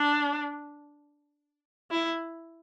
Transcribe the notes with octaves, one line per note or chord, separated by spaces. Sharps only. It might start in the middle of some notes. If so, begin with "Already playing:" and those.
Already playing: D4
E4